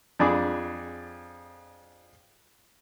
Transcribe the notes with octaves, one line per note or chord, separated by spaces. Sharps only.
F2 D4 G#4 B5 D6